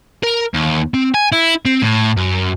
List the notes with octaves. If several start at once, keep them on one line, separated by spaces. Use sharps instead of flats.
A#4
D#2
C4
G#5
E4
C4
A2
F#2